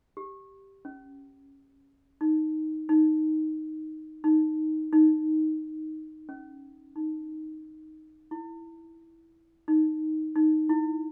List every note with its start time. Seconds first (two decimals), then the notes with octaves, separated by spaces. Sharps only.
0.17 G4
0.85 C#4
2.21 D#4
2.89 D#4
4.24 D#4
4.93 D#4
6.29 C#4
6.96 D#4
8.31 E4
9.68 D#4
10.36 D#4
10.69 E4